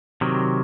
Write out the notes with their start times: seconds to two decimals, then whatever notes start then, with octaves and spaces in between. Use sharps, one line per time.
0.21 C3 D#3 F#3